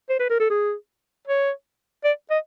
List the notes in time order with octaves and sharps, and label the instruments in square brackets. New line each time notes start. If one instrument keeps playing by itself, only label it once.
[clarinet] C5
B4
A#4
A4
G#4
C#5
D5
D#5